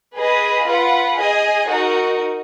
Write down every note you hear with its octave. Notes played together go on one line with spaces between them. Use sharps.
G#4 B4 D#5
F4 B4 F#5
G#4 D#5 G#5
D#4 F#4 A#4